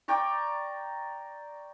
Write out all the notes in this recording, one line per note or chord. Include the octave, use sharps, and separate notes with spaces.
D5 G5 A#5 C#6